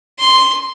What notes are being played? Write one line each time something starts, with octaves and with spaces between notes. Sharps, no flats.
C6